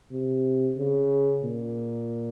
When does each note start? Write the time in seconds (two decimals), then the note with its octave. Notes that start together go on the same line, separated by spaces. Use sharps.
0.12 C3
0.77 C#3
1.44 A#2